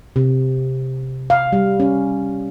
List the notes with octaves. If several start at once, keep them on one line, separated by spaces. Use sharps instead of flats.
C3
F5
G3
C#4